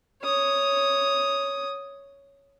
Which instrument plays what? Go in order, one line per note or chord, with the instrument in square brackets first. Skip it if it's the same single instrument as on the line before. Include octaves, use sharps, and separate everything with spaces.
[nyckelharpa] C#5 D#6